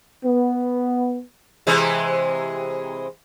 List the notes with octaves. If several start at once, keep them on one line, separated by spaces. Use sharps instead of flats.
B3
C3 E3 G#3